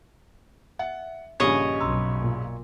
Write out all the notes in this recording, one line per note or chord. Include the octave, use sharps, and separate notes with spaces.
E5 F#5
A#1 G2 C#3 G4 A4 C#5 D#5 G#5
B1 A#5 C6 E6
A#2